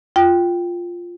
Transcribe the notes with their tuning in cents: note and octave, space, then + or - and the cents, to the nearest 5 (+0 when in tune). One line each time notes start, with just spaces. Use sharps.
F4 +0 G5 +0